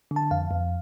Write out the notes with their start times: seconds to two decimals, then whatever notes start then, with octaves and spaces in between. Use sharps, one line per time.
0.11 D3
0.16 A5
0.31 F2 F5
0.51 F2